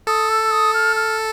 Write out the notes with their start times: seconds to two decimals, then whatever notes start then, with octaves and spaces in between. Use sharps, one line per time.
0.07 A4 D#6
0.29 E6
0.51 D#6
0.74 F6
0.96 F6